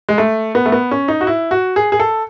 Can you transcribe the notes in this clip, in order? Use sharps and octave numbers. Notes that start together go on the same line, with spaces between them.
G#3
A3
B3
A3
B3
C#4
D#4
F#4
E4
F#4
G#4
G#4
A4